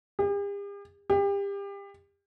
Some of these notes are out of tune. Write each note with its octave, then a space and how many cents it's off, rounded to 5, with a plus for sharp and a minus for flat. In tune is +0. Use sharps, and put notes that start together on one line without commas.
G4 +45
G4 +30